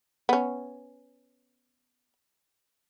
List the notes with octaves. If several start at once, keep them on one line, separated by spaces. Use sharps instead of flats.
B3 C#4